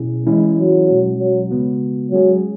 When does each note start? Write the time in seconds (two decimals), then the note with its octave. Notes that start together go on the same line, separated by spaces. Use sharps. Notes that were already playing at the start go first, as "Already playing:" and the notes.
Already playing: B2 F#3 C#4 E4 G#4
0.26 E3 G#3 C#4 E4 G#4
0.57 F#3
0.88 B2 G#3 C#4 F#4
1.19 F#3
1.50 C#3 G#3 B3 F#4
2.11 F#3 G#3 C#4 G#4